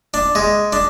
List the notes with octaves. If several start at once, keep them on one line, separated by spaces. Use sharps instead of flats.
D4
G#3
D4